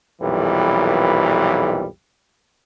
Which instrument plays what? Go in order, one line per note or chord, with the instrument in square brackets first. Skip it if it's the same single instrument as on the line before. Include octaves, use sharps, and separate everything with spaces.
[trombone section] B1 F2 A#2 E3 G3